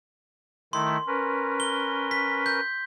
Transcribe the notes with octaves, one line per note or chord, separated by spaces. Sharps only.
D#3 A3 E4 C6
C#4 A#4 B4
G7
B6
G6